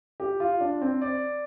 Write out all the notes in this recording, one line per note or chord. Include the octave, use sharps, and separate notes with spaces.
G4
F4
D4
C4
D5